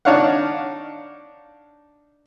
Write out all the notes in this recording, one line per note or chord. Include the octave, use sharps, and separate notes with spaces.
D4 D#4 C#5 F5 F#5